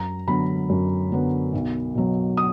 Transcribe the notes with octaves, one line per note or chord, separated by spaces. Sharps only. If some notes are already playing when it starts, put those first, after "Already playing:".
Already playing: F#2 A#5
D3 F#3 B3 B5
F#2
D3 F#3 B3
B1
B2 F#3
D#6